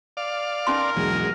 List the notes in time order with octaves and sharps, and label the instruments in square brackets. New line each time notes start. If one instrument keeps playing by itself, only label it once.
[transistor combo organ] D5 F5
[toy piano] C#4 D#4 C6 [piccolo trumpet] A#4
[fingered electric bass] B1 E2 [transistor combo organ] F#3 G#3